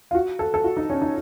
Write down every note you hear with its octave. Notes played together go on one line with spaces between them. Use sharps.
F4
F#4
A4
A4
F#4
D#4
C#4
D#4